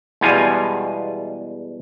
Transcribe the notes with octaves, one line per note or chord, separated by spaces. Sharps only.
E2 B2 G3 G#3 F4 G#5